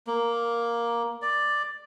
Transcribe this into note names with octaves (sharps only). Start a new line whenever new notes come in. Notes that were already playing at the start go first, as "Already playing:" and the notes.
A#3
D5